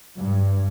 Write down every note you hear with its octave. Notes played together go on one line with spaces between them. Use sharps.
G2